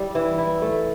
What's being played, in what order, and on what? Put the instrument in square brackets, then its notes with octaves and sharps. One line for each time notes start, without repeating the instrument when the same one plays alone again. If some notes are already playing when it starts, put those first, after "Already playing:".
Already playing: [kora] G3 E4
E3
E4
A3